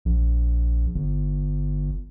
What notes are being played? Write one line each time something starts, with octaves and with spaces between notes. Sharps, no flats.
A#1
G1